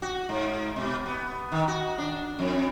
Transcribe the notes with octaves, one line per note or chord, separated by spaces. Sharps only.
F#4
G#2
B2
B3
D#3
F#4
D4
F2